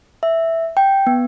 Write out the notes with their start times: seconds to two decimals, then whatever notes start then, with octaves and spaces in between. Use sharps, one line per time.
0.23 E5
0.77 G5
1.07 B3